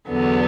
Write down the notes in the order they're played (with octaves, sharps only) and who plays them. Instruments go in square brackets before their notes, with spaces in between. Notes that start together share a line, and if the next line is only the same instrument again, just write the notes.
[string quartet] E2 D3 F#3 B3